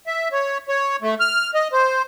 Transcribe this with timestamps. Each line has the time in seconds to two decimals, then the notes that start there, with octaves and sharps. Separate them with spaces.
0.07 E5
0.32 C#5
0.69 C#5
1.02 A3
1.20 F6
1.54 D#5
1.72 C5